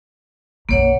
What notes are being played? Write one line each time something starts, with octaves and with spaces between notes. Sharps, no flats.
B1 F#2 A#3 C#5 F#5